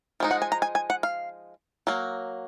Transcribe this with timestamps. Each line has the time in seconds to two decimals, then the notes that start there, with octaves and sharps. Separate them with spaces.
0.20 F3 G#3 D#4
0.31 F#5
0.42 G#5
0.52 A#5
0.62 G#5
0.75 G#5
0.90 F#5
1.03 F5
1.87 F#3 A#3